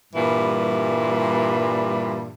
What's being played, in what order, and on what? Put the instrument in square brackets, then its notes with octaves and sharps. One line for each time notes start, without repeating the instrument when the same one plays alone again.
[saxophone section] G2 A#2 E3 G3